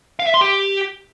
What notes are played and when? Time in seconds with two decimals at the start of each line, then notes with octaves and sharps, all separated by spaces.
0.19 F5
0.27 E5
0.34 C6
0.41 G4